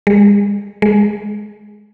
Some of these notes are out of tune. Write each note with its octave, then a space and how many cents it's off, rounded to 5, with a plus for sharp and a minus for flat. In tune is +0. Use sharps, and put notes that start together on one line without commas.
G#3 -40
G#3 +5